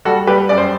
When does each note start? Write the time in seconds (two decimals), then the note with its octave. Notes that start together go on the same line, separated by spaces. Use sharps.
0.05 G3 F#4 A4
0.27 G3 G4 B4
0.49 F#2 D5
0.58 C5